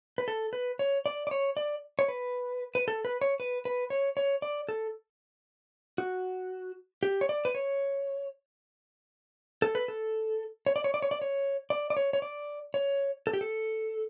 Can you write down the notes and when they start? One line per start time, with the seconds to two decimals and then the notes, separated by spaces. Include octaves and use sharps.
0.18 B4
0.28 A4
0.53 B4
0.79 C#5
1.06 D5
1.27 D5
1.31 C#5
1.57 D5
1.99 C#5
2.09 B4
2.75 B4
2.88 A4
3.05 B4
3.21 C#5
3.40 B4
3.65 B4
3.90 C#5
4.17 C#5
4.42 D5
4.69 A4
5.98 F#4
7.03 G4
7.21 C#5
7.29 D5
7.45 B4
7.55 C#5
9.62 A4
9.75 B4
9.88 A4
10.66 C#5
10.76 D5
10.84 C#5
10.94 D5
11.02 C#5
11.11 D5
11.22 C#5
11.70 D5
11.90 D5
11.97 C#5
12.13 C#5
12.22 D5
12.74 C#5
13.27 A4
13.33 G4
13.41 A4